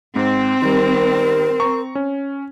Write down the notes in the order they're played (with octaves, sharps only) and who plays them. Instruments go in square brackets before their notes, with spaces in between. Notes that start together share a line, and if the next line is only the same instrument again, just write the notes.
[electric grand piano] G#2 [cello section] C4
[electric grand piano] D#3 G3 [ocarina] A#4
[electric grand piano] A#5 C#6
C#4